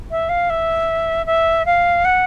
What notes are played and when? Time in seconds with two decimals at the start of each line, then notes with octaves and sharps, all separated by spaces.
0.11 E5
0.29 F5
0.50 E5
1.26 E5
1.65 F5
2.05 F#5